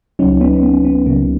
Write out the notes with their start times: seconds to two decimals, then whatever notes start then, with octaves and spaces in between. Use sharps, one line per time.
0.19 C#2 C#3 F#3 C#4 D#4
0.40 B3 C#4
0.63 B3
0.85 B3
1.06 C#2 C#3 F#3 A#3